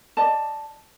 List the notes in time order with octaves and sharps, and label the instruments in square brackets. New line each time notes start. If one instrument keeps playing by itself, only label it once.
[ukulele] D5 D#5 A5